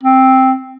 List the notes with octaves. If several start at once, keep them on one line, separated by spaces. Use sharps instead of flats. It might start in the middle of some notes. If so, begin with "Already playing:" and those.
C4